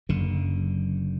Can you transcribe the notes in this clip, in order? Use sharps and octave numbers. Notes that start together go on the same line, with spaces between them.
F#1 F#2 D3